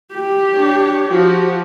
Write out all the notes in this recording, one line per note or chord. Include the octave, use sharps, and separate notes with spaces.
G4
D4 C#5
F3 F#4 G4